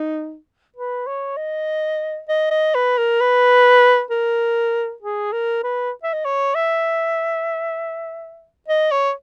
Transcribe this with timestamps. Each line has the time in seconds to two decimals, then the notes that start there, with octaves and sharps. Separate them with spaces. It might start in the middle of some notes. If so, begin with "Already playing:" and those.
Already playing: D#4
0.77 B4
1.07 C#5
1.37 D#5
2.29 D#5
2.51 D#5
2.75 B4
2.98 A#4
3.20 B4
4.11 A#4
5.03 G#4
5.32 A#4
5.64 B4
6.03 E5
6.13 D#5
6.25 C#5
6.55 E5
8.68 D#5
8.91 C#5